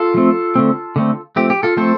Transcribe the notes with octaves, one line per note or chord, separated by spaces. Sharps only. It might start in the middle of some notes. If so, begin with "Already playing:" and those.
Already playing: F4 A4
F3 A3 C4
D3 A3 C4
D3 A3 C4
F3 A3 C4 G4
G4
F4 A4
F3 A3 C4 A4 C5